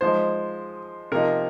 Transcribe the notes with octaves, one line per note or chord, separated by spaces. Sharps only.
F3 G#3 D#4 C5
C3 F3 A#3 D#4 A#4